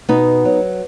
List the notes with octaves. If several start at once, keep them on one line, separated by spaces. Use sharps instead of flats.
B2 B3 D#4
F#3